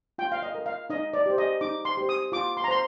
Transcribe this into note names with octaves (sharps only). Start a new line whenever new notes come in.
F4 G5
F5
D#5
A#4
F5
D#4 D#5
D5
G4 C5
D#5
D#4 D6
C6
G4 C5
D#6
F4 D6
C6
A#5
C5 C6